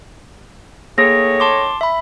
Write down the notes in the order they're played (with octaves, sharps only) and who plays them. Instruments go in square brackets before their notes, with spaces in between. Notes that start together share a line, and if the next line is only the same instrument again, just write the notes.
[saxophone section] D#3 A3 C#5 [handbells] A#3 G#4 [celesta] A#6
[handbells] A5 C6 D6
E5 B5